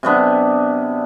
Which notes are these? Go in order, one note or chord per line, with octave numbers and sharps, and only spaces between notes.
C3 F#3 B3 D4